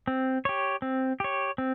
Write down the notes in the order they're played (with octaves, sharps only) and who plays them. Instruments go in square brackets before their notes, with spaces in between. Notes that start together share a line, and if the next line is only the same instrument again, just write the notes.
[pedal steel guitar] C4
G4 C#5
C4
G4 C#5
C4